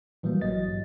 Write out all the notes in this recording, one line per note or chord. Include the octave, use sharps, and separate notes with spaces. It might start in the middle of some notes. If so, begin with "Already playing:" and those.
A2 E3 F#3 G3 A#3
A1 F#3 D#5 A6
G2